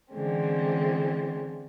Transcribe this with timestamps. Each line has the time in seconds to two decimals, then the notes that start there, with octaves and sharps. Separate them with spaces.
0.12 D3 E3 G#3 C4 C#4